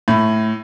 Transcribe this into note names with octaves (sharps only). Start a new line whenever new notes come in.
A2